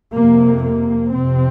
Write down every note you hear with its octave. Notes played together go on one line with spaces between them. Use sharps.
F2 C3 A#3
A#3
F2 C3 C4